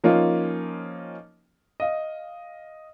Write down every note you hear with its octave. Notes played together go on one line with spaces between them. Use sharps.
F3 A#3 C#4 D#4 F4
D#5 F5